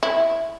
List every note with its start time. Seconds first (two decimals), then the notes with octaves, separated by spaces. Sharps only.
0.03 E4